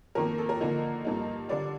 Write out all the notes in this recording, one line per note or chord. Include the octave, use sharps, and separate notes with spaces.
F2 D#3 A#3 A#4
A4
A#4
D3 F3 A#3 D#4
G2 F3 A#3 D#4
D3 G3 D4 D5